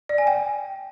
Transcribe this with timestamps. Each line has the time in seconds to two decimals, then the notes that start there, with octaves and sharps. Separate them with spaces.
0.09 D5
0.18 G#5
0.27 G5